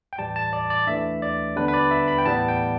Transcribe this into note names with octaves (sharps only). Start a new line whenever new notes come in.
G5
A2 E3 G3 A5
A5
D5
D5
E3 A3 D4 E5
D5
D3 G3 B3 D4 B4
B4
D5
E5
B5
G5
A2 E3 G3 B3 A5
G5